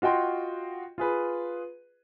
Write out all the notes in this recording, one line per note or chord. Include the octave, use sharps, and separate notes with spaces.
F4 F#4 D#5 G5 C6
F4 G#4 B4